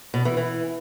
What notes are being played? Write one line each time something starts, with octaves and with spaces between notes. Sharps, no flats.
B2
E3
E3